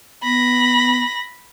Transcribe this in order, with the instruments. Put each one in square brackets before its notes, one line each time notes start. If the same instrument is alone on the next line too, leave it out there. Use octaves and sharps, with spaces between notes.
[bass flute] B3 [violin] B5 A#6